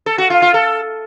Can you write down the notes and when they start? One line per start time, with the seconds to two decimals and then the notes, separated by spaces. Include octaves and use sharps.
0.06 A4
0.18 F#4
0.30 F4
0.42 F4
0.54 A4